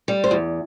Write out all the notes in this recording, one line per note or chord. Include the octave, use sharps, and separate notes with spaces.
G3
C5
E2